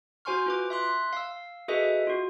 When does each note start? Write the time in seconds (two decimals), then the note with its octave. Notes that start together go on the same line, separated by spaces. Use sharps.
0.25 F#4 C5 G#5 C6 C#6 F6
0.46 F4 B4 D6
0.70 E5 C6 F#6
1.13 F5 E6
1.68 F#4 G#4 A4 B4 D#5 E5
2.07 F4 F#4